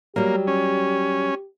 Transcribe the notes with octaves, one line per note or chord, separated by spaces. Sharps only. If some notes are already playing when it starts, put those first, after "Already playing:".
F#3 G3 A#3 G4
C#4